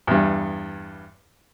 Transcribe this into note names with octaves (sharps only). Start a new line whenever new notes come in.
E2 G2